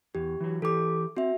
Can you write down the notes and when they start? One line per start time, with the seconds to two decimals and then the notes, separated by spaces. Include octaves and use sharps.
0.15 E2 G4
0.41 E3 F#3
0.62 E3 G4 A4 D6
1.17 C4 F#4 E5